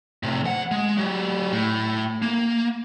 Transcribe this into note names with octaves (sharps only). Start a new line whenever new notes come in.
A2 C3
E3 F#5
G#3
F#3 G4
A2
A#3